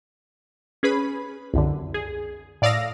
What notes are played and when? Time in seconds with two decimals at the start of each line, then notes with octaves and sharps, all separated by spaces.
0.83 C#4 G#4 B4 B5
1.54 C2 F#2 D3
1.94 G#4
2.62 A2 D5 F5 D#6 E6 A#6